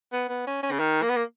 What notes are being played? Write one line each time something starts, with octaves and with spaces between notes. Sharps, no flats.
B3
B3
C#4
C#4
C#3
D#3
A#3
B3
A#3